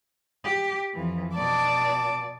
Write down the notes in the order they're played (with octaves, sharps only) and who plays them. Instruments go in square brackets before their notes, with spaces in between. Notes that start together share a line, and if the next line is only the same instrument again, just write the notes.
[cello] G4
F2 E3
[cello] B2 D5 [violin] A5 D6